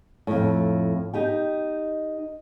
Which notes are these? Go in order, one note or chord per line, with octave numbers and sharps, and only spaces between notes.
F2 A2
D#4 G4 G5